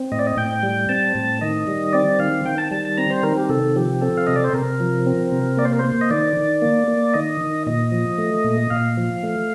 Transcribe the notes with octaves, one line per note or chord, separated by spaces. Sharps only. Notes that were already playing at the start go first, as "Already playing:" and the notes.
Already playing: C4
A2 D#5
D5
D#5
A2 G5
G3
C4 A5
A2
D#3 D#5
G3
C4 D5
D#3 F5
D#3 G5
A5
G3 A5
A5
C4 A#5
C5
D#3 A#4
G4
C3 A4
F3 G4
C4 A4
F5
C3 D#5
D5
C5
C3 A#4
F3
C4
C3
A#3 D5
C5
A#4
C5
A#3
D#5
D#3 D5
D#3
A#3
A#3
D#3 D#5
D#3
A#2 D#5
F3
A3
A#2
A#2 F5
F3
A3